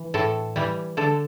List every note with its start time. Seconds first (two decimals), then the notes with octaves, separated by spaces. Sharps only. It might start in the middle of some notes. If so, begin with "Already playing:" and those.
Already playing: E3
0.14 A2 A4
0.56 E3 G3
0.97 D3 A4